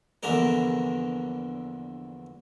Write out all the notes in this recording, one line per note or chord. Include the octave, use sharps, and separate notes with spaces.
A#1 E2 D3 D4 A#4